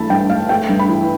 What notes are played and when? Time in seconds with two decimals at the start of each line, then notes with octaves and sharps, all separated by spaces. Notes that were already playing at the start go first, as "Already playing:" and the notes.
Already playing: G2 E3 A3 A5 B5
0.10 G2 G5
0.30 A3 F5
0.49 A3 G5
0.69 G2
0.79 B5
0.89 E3